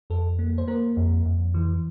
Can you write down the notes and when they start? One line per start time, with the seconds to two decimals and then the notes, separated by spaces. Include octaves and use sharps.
0.10 F2 A4
0.39 A#3
0.58 C5
0.68 A#3 A#4
0.97 F2
1.26 F2
1.54 E3